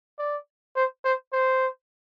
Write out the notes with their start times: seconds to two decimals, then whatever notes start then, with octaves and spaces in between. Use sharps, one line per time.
0.19 D5
0.76 C5
1.05 C5
1.33 C5